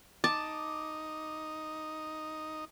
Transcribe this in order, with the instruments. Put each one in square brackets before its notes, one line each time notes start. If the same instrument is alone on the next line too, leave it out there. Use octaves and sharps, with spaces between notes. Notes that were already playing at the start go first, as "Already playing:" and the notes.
[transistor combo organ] D#4 [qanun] A5 [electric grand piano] D6